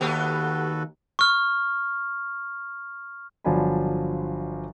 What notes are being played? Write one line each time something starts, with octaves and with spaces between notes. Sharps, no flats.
D#2 A3 B3 F#4 G4 A4 B4
C#6 F6
G1 F3 F#3 D4 G#5 B5